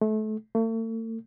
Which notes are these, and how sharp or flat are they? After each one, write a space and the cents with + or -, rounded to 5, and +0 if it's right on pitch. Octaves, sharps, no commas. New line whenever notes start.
A3 -30
A3 +40